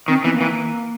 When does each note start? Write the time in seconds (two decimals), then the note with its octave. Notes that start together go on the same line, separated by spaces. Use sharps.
0.08 D#3 C4
0.24 E3 B3
0.32 A#3
0.41 E3